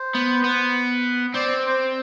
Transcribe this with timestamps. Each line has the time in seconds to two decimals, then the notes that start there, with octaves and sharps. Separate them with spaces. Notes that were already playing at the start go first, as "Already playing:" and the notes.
Already playing: C5
0.15 B3
0.44 B3
1.35 C4 D5
1.66 C5